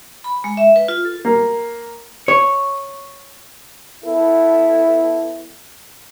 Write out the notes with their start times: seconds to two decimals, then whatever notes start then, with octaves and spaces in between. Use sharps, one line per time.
0.24 B5
0.44 G#3
0.57 E5
0.76 B4
0.88 F4
1.05 A4
1.25 A#3
2.28 C#5
4.05 B3 E4 A4